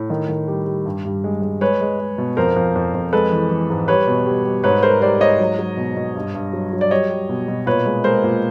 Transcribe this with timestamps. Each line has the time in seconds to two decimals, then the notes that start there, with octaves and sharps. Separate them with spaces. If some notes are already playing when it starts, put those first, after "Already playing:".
Already playing: A2
0.10 D#3
0.29 D#3
0.48 G3
0.67 G3
0.86 G2
1.05 G2
1.24 G#3
1.42 G#3
1.61 G#3 B4 C#5
1.81 G#3
2.00 G#3
2.18 B2
2.37 F2 A#4 C5
2.56 F2
2.75 F2
2.94 F2
3.13 G#3 A4 B4
3.32 E3
3.50 E3
3.70 G#2
3.88 G3 B4 C#5
4.07 B2
4.26 G3
4.45 G3
4.64 G#2 B4 C#5
4.83 G#2 A#4 C5
5.02 G3 C5 D5
5.21 G#2 C#5 D#5
5.39 F#3
5.59 F#3
5.77 B2
5.96 B2
6.16 G2
6.35 G2
6.53 F#3
6.73 F#3
6.81 D5
6.91 G3 C#5 D#5
7.10 G3
7.29 B2
7.48 B2
7.66 A#2 B4 C#5
7.86 G#3
8.04 G#3 A#4 C5
8.24 A#2